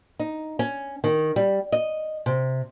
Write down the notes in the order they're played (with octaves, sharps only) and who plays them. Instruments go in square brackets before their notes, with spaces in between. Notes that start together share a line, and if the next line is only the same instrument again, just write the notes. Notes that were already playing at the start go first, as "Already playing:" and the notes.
[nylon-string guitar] D#4
C#4
D#3
G3
D#5
C3